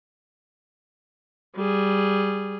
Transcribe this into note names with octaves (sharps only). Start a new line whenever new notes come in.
G3 G#4